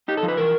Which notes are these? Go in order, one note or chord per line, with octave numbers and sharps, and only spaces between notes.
D#4 G4
A4
F3
B4
E3 A#4